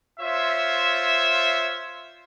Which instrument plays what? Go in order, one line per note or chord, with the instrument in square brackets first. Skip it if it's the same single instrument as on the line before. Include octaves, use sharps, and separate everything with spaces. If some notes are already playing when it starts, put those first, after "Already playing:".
[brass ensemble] F4 C5 C#5 E5